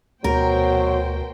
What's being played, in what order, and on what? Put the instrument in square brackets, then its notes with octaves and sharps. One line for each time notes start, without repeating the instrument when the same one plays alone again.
[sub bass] D2 [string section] B2 C5 G5 [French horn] F#3 [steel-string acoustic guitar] A#4